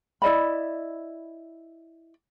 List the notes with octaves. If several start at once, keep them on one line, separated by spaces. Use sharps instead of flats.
E4 D5 D#5 B5